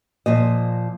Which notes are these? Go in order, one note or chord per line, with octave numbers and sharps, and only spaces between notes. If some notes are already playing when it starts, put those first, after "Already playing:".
A#2 F3 D#5